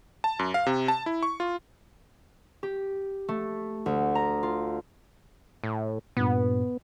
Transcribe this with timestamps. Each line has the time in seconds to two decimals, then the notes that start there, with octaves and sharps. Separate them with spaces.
0.24 A5
0.39 F#2
0.54 F5
0.66 C3
0.88 A5
1.06 E4
1.23 C#6
1.40 F4
2.63 G4
3.29 A3
3.86 D2
4.15 A#5
4.43 F4
5.64 A2
6.17 G2 A#2 B3